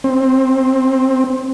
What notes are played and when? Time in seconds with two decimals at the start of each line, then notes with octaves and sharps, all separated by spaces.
0.04 C4